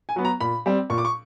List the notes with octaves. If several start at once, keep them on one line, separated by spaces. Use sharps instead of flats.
G#5
F#3 B3
A#5
A#2 B5
G3 C4
A#2 C#6
D6
C#6